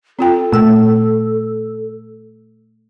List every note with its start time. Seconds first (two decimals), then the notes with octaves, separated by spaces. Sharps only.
0.19 C4 F4 A4 G5
0.52 A#2 A3 E6